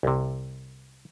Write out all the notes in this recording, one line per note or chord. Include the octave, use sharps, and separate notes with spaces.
C2 C3